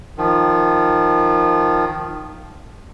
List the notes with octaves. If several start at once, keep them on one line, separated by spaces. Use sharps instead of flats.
D#3 F3